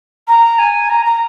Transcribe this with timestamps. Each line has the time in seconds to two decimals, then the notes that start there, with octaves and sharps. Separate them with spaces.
0.28 A#5
0.58 G#5
0.89 A#5
1.05 A#5